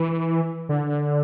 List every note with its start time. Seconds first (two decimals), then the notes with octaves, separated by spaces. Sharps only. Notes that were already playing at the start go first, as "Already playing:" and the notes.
Already playing: E3
0.69 D3